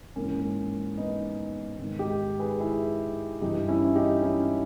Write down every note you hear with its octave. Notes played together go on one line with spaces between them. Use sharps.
G#2 E3 A#3 C#4
B3 D#4
G#2 D#3
D#4 G4
G#4 B4
E4 G#4
G2 E3 D#4 G4
C#4 E4
D#4 G4
C#4 E4